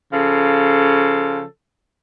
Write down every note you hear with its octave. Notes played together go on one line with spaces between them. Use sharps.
C#3 F3 A4